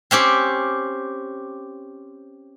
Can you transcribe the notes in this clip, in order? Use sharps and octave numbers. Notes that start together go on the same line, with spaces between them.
C4 C#4 G4 C5